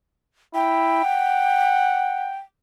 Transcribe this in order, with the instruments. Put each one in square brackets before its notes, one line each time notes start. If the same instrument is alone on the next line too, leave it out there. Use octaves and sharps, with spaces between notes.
[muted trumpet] E4 [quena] G5
[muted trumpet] F#5